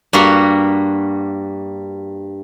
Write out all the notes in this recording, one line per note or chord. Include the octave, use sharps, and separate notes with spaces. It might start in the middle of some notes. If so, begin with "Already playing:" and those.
G2 G3 A#3 F#4 C6